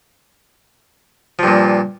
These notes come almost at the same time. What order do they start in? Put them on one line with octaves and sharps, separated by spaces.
F3 G2 A#2